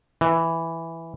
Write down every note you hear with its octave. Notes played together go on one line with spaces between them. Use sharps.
E3